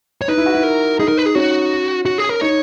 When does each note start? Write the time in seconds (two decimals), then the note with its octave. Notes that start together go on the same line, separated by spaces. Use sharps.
0.21 C#5
0.28 D#4 B4
0.38 E4
0.46 F#4
0.55 E4
0.63 A#4
0.99 D#4 G#4
1.08 A#4
1.17 B4
1.26 G#4
1.35 C#4 F#4
2.06 F#4
2.18 G#4
2.29 A#4
2.41 D#4 C#5